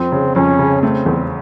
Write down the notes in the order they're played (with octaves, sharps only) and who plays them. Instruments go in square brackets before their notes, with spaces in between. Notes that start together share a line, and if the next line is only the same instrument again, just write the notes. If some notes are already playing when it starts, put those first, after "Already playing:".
Already playing: [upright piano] F2 [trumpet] C4
[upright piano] C#3
[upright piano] F2 [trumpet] C#4
[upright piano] C#3
[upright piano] A3 [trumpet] C4
[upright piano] E2